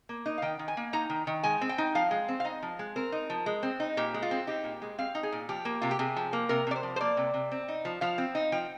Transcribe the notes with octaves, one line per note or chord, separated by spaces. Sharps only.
A#3
D#4
F5
D#3 G5
D#3
G#5
A#3
D#4 A#5
D#3
D#3
G#3 G#5
C4
G5
D#4
F3 F5
G#3
C4
F5
D#4 D#5
F3
G#3
C4 A#4
D#4
F3
G#3
C4
D#4
A#2 G4
G#3
F4
C4
D#4 G4
A#2
G#3
C4 F5
D#4
G#4
A#2
F3 G4
A#3
C3 F4
G4
C3 G#4
F3
A#3
C3 A#4
C3 D5
C5
F3
C5
A#3 D5
C3
C3
C4
D#4
F3
F3 F5
C4
D#4
F3 G5